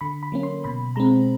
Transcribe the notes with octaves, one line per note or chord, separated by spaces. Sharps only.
D3 B5
B5
F#3 A#3 C#4
C6
B2 B5
G#3 C4 A#5